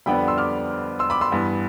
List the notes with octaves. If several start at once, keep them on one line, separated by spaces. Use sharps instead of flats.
F2 D3 G3 B3 D4 G5 B5
C6 E6
D6 F6
C6 E6
B5 D6
C6 E6
G2 E3 B3